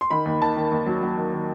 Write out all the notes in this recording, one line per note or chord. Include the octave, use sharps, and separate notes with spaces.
C6
D#3 B5
D#2
D#3 A5
D#3
D#2
F#3
F#3
D#3
D#3